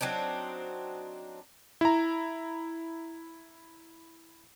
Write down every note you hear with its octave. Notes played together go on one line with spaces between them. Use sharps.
F#3 C4 D4 D#4
E4 A#5